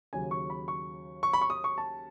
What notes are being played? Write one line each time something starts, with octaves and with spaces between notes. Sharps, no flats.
D#2 C#3 F#3 G#5
C#6
B5
C#6
C#6
B5
C#6
D#6
C#6
A5